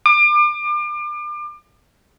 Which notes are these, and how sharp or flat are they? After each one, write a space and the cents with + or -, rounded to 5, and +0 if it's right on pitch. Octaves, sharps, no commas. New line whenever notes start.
D6 +35